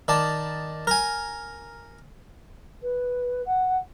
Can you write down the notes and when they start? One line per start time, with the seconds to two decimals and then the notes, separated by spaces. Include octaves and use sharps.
0.08 D#3 D5 A5
0.87 A#4 G#5
2.82 B4
3.45 F#5